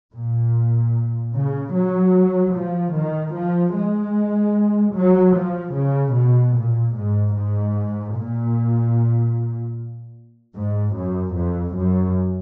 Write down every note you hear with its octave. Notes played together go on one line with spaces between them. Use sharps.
A#2
C#3
F#3
F3
D#3
F3
G#3
F#3
F3
C#3
B2
A#2
G#2
G#2
A#2
G#2
F#2
F2
F#2